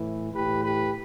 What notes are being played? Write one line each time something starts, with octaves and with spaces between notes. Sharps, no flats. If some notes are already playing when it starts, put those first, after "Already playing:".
Already playing: A2 E3
A2 E3 G4 B4
G4 B4